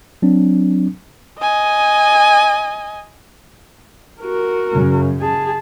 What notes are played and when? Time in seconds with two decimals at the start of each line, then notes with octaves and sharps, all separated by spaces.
0.22 F#3 C4 D4
1.40 D#5 G#5
4.21 F#4 A#4
4.72 F#2 C#3
5.21 G#4 A5